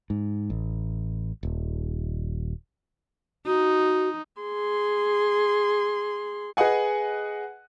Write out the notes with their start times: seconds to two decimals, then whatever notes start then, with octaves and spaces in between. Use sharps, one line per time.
0.10 G#2
0.50 A1
1.43 D#1
3.46 D#4 F#4
4.41 G#4 C6
6.57 G#4 B4 D#5 F#5 G#5